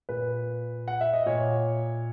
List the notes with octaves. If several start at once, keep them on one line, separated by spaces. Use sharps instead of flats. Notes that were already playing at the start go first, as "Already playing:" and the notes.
A#2 B4
F#5
E5
D#5
A#2 C#5